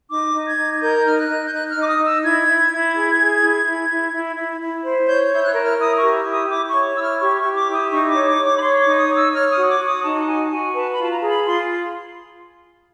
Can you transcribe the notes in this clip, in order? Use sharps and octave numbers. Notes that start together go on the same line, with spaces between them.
D#4 D6
D#4
G#6
D#4
G#6
A#4 G6
D#4 F6
F#6
D#4
G6
D#4 F#6
F6
D#4
D6
D#6
D#4
E6
E4 G#6
E4
E4
G#4
G#4
E4
E4
E4
E4
E4
E4
C5
C#5 G6
E4 G6
F#6
A#4
F6
E4 D#6
C#6
G4
E4
D#6
E4 D6
C#6
C#5
E4 E6
F6
G4 C#6
C#6
G4
D6
E4
D#6
D#4 C#6
D6
C#5
D6
C#5
D6
B5
C#5 C6
D6
D#4
D#6
C#5
E6
C#5 F6
D#6
F#4
D6
F#4
D#6
D#4 A5
F#4 G#5
F#4 G#5
B4 A5
B5
F4 A5
A#5
G#4 A#5
B5
F4 C6